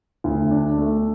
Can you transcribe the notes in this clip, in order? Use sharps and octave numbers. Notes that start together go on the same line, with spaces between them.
D2
D4
A3